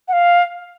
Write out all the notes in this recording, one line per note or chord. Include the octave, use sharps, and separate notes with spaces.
F#5
F5